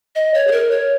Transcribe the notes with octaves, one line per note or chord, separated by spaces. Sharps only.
D#5
C#5
G#4
A#4
C#5